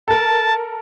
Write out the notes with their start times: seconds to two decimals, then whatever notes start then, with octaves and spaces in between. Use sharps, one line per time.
0.08 A4 A#4 A5